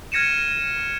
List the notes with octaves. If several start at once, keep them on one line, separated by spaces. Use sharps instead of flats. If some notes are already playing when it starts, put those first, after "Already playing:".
F6 G#6 A#6 C#7 D#7 E7